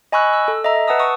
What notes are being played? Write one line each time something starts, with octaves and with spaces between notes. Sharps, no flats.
D#5 G#5 B5 C#6 E6 F#6
E6
A4
D#5 E5 A#5
B4 F#5 A5 D#6 E6
C#6 D#6